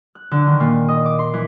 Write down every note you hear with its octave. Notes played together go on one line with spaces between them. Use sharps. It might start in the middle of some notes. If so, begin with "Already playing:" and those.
F#6
D3
D#3
A#2
D#5
D6
C6
E3